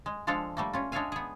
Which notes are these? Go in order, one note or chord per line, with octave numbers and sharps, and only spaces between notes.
G#3
F3 G#3 D4 A4 F5
G3 A3 A#3
C#4 F4
G#3 D4 C#5 E5 F5 G#5
B3 G#4